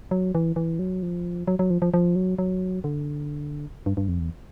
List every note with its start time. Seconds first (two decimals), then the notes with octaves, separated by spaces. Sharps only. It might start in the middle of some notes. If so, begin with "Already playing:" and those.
0.11 F#3
0.35 E3
0.56 E3
0.79 F#3
1.03 F3
1.48 F#3
1.59 F#3
1.70 F3
1.82 F3
1.94 F3
2.16 F#3
2.39 F#3
2.84 D3
3.86 G2
3.97 G2
4.09 F2
4.19 E2